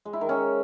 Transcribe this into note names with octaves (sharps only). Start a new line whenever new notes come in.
G#3
E4
D#3
C#4